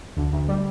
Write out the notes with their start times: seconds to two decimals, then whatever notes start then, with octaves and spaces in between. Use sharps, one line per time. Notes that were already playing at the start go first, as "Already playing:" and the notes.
0.17 D2
0.33 D2
0.48 G3